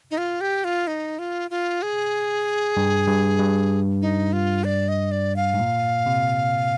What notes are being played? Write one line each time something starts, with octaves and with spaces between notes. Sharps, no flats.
D#4
F4
G4
F4
D#4
F4
F4
G#4
G2
G2
G2
D#4
F4
D5
D#5
D5
F5
G#2
A#2
C3